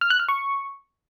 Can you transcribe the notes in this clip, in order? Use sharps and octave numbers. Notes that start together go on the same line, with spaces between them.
F6
F#6
F6
C#6